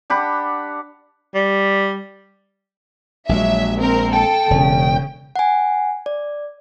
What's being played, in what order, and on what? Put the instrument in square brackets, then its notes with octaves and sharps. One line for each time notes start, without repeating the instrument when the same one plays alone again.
[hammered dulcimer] D4 G4 F#5 B5
[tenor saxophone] G3
[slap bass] A#1 G#3 [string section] F#3 E5
[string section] C4 A#4
[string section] A4 [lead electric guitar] G5
[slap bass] E1 [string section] C#3
[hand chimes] F#5 G#5
D5